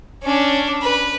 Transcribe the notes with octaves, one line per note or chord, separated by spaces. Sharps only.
C#4 D4
B4